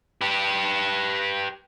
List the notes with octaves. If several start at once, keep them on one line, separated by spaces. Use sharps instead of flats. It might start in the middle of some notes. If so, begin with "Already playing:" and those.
G4 B4